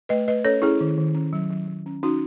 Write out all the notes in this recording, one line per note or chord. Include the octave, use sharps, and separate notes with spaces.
A3 B4 D#5
A3 B4 D#5
C#4 A4 C#5
C#4 E4 G#4
D#3
D#3
C#4
F#3
F#3
F#3
C#4
C#4 D#4 F#4